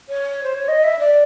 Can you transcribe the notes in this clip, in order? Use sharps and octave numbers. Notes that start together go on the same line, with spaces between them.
C#5
C5
C#5
D#5
E5
D5